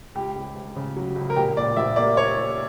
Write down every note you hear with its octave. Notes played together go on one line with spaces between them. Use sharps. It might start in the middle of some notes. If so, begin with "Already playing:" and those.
C#2 G4
C#2
C#2
C#3
F#3
C#2
A#4
A#1 G4
A#2 D5
A#1 E5
A#3 D5
C#5